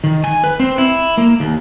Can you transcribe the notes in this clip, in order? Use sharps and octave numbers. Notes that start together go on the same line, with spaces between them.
D#3
G#5
B4
C4
E4
A#3
D#2